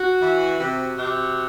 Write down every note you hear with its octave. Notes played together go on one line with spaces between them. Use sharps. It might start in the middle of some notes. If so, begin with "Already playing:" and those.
Already playing: F#4
E3
C3 F#4
C3